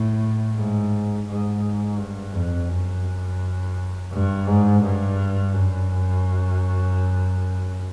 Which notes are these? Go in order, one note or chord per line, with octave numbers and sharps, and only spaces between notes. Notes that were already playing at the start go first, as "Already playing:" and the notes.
Already playing: A2
G#2
G#2
G2
F2
F#2
G2
G#2
G2
F#2